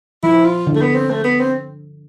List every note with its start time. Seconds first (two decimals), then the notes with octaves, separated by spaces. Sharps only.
0.23 F3 E4
0.46 F4
0.67 D3
0.76 A3
0.82 B3
0.95 C4
1.11 A3
1.24 B3
1.40 C4